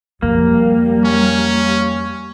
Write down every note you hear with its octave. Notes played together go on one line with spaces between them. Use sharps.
F2 G3 A#3
C#4